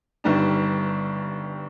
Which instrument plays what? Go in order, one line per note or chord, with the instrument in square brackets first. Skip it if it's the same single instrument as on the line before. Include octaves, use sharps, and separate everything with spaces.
[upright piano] G1 G2 D#3 G3 D4